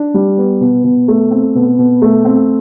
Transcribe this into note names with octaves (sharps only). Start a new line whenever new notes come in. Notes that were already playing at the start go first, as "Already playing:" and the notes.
Already playing: D4
G3
B3
B2
B2
A3
C4
B2
B2
A3
C4